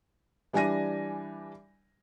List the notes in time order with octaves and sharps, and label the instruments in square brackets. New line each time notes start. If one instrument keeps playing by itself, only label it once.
[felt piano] E3 G3 D4 G#5 A#6 D#7